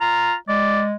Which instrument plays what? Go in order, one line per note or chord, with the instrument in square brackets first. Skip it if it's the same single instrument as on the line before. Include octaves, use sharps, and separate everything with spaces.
[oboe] F4 [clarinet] A#5
[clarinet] G#3 [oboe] D5